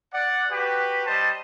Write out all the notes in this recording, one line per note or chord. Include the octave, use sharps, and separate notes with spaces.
D5 F#5
F#4 G4 B4
G3 C5 D#5 A5